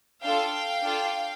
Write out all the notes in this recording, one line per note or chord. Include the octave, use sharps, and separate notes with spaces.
D4 F4 A4 F5 G5
D4 F4 A4